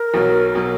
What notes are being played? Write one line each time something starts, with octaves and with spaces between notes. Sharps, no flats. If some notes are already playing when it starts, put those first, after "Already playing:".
Already playing: A#4
B1 B2 F#3
B2 F#3